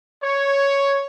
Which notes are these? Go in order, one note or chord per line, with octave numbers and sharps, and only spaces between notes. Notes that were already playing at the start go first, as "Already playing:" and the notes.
C#5